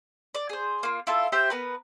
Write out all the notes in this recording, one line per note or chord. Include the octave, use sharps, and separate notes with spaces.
D5
G#4 C5
A#3 F4
E4 F4 A4
G4 C5 E5 G5
B3 A#4 B4